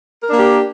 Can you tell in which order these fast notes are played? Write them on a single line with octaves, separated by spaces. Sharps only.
A#4 D4 A#3 G4